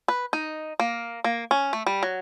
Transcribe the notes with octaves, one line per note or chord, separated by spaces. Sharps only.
B4
D#4
A#3
A#3
C#4
A3
G3
F#3